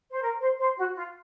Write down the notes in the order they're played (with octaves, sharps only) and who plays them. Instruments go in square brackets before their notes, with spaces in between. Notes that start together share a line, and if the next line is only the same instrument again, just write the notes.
[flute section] C5
A#4
C5
C5
F#4
F4